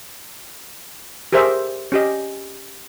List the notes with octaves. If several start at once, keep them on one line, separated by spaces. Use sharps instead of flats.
G4 G#4 A#4 C5 E5
C#4 G4 D#5